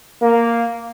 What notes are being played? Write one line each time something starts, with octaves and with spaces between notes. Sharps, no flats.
A#3